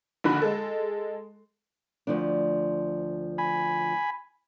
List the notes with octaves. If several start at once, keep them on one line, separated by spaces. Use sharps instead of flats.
A#1 D#2 D3 F#4 B5
G#3 A4
D2 F3 D4
G#5 B5